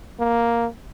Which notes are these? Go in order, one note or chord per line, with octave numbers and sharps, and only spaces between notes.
A#3